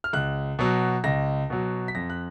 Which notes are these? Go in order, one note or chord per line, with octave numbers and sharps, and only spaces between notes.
F6
C#2 F#6
B2 F#3
C#2 A#6
B2 F#3
B6
F2 A#6
F#6